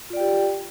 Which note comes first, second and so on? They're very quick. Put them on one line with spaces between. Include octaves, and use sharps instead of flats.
F4 D5 G5 G4